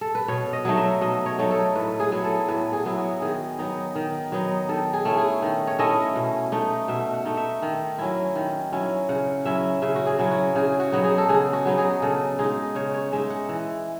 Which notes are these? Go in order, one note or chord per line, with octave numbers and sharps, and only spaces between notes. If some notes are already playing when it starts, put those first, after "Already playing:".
A4
B4
B2 C#5
D#5
F#3 A3 D#4
E5
B2 D#5
C#5
F#3 A3 D#4
A4
A2 B4
G#4
F#3 B3 E4
A4
A2 B4
G#4
F#3 B3 E4
F#4
D#3 G#4
F#3 B3 D#4
D#3
F#3 B3 D#4
D#3 A4
G#4
A3 C#4 E4
G#4
D#3
C#5
A3 C#4 E4 D#5
B2
A3 D#4
B2 E5
F#5
A3 D#4
E5
D#3
F#3 C#4 E4
D#3
F#3 C#4 E4
C#3 F#5
F#3 C#4 E4 E5
C#3 E5
F#4
G#4
F#3 C#4 E4
F#4
C#3 G#4
F#4
F#3 B3 D#4
G#4
A4
C#3 G#4
F#4
F#3 B3 D#4
G#4
C#3 A4
G#3 D#4 G#4
C#3 C#5
C#5
G#3 D#4 E5
F#5
E3